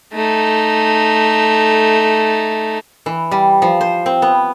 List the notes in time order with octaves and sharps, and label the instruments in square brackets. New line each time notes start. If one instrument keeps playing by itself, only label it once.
[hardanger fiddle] A3 D#4
[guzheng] E3
G3
F3
C5
C4
B3